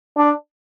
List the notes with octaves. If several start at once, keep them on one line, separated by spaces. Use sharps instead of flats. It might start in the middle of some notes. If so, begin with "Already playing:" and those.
D4